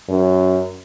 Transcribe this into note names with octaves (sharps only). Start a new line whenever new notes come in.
F#2